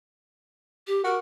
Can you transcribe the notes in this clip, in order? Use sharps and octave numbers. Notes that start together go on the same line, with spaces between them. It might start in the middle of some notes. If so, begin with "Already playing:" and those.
G4
F#4 A#4